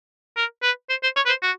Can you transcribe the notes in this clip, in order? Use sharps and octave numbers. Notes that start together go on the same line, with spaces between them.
A#4
B4
C5
C5
C#5
B4
C5
F#4